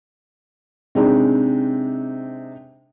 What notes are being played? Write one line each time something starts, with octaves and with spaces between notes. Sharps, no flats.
C3 G#3 C4 D4 D#4